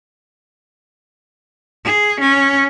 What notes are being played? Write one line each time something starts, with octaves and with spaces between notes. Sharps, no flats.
G#4
C#4